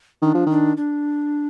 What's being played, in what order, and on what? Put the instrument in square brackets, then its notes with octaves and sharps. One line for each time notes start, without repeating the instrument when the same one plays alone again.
[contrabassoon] D#3 [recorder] D4
[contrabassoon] F3
[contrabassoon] D#3 [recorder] D4
[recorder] D4